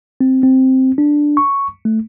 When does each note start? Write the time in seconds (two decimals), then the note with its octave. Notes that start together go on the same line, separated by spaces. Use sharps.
0.21 C4
0.43 C4
0.98 D4
1.37 C#6
1.85 A3